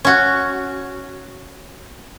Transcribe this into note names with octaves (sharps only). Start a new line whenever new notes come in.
C#4 F#4